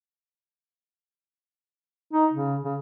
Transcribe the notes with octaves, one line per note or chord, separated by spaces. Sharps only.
D#4
C#3
C#3